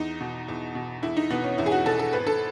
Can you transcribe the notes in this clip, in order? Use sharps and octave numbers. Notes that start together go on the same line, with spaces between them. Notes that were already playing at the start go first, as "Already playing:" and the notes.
Already playing: E2 D#4
B2
E2
B2
E2 E4
D#4
B2 B3
C#4
E2 E4
G#4
F#4
B2 A4
A4
G#1 B4
A4